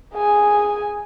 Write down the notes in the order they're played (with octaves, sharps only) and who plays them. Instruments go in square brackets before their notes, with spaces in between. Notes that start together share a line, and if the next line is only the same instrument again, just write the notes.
[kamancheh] G#4 G#5